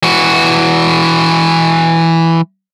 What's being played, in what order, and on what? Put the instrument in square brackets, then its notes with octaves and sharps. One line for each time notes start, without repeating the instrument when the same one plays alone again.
[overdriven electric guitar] E3 F#4